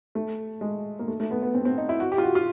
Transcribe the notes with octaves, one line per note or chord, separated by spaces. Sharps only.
A3
G#3
A#3
A3
A3
B3
B3
C4
C4
D#4
E4
F#4
G4
F4
F#4
F4